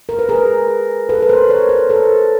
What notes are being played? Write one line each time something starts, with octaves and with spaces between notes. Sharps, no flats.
A#4
B4
G#4 A#4
A4 B4
B4
A#4 C5
B4 C#5
A#4 C5
A4 B4